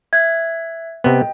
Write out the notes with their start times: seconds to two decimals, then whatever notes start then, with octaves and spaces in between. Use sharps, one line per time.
0.13 E5 F#6 G#6
1.04 C3 B3 D#5 G5